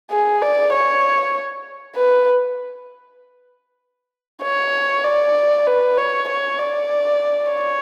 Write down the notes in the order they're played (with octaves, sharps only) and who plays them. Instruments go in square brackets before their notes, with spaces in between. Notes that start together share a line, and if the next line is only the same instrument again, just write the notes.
[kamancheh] G#4
D5
C#5
B4
C#5
D5
B4
C#5
C#5
D5
C#5